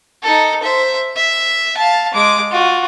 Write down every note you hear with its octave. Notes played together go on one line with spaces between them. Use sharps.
D#4 A4
C5 E5
E5
F5 A5
G#3 D6
F4 F#4